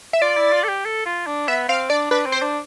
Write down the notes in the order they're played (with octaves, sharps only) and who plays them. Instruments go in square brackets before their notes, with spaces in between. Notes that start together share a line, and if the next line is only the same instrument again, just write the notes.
[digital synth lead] E5
[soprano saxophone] F4 [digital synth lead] D5
[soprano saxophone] E4
F4
A4
G4
A4
F4
D4
[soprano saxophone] B3 [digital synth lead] E5
[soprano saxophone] C4 [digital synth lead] F5
[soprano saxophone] D4 [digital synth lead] D5
[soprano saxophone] D4 [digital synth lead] B4
[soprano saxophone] C4
[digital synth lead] C5
[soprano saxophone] D4